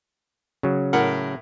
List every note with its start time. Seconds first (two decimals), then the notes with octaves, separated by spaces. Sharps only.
0.63 C#3 F#3
0.93 A2 A#4 F#5